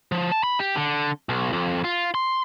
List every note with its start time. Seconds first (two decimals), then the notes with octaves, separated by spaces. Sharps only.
0.12 F3
0.32 A5
0.43 B5
0.60 G4
0.76 D3
1.29 B1
1.53 F2
1.84 F4
2.15 C6